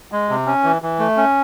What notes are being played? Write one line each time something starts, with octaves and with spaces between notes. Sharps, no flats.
G#3
C3
C#4
E3
E3
A3
C#4